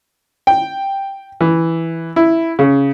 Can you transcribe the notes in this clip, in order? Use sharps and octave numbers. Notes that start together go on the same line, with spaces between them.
G5
E3
E4
C#3